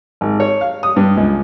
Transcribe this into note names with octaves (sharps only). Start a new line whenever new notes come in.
G#1
C#5
F5
D#6
G2
C#2